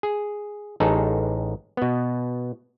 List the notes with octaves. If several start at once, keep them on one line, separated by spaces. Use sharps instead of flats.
G#4
A1 D#4 G#4 A4
B2 B3